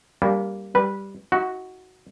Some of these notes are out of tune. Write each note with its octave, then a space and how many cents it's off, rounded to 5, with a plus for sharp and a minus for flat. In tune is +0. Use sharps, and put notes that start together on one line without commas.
G3 +0 A#3 +0 D4 -45
G3 +0 B4 -15
D#4 +45 F#4 +0